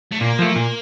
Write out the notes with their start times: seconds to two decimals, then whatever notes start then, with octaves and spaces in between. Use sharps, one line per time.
0.12 A3
0.20 A#2 A#3
0.39 F3 A3
0.56 A#2